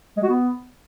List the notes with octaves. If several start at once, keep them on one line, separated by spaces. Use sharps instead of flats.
G#3
F#4
B3